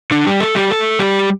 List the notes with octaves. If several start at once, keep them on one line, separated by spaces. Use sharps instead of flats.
D3 D4
G3 G4
A3 A4
G3 G4
A3 A4
G3 G4